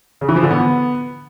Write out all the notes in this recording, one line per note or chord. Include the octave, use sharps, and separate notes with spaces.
C#3
E3
F3
D3
B3